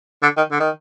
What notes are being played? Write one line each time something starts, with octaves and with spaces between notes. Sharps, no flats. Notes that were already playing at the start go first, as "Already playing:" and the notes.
D3
D#3
D3
D#3